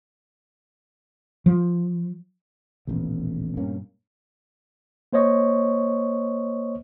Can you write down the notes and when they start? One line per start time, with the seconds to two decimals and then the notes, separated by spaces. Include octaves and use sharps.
1.46 F3
2.87 E1 A1 D#2 A#2 G#3 B3
3.57 G2 A#3 C#4
5.13 A#3 C5 C#5 D#5 C#6